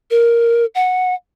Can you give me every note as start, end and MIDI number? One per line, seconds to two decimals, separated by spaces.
0.11 0.66 70
0.75 1.14 78